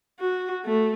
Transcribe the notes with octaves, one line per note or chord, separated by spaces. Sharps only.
F#4
A3